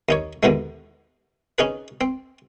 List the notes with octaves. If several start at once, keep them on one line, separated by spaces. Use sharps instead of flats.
D#2 D#4 C#5
D#2 B2 D3 E3 G#3
C#4 D#4 G#4 B4
C4